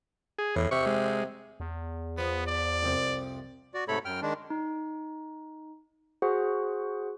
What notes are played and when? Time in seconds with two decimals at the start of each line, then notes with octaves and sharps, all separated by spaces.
0.39 G#4
0.56 E2 A2
0.71 C3 C#6
0.86 G#3
1.60 E2
2.17 F3 B3
2.47 D5
2.83 C2 F2 C3
3.74 F#4 D5
3.88 G#2 C3 A3 A4 C#5 B5
4.05 F#2 G5 F6
4.22 D#3 G#3 D4
4.50 D#4
6.22 F#4 G#4 C5 F#5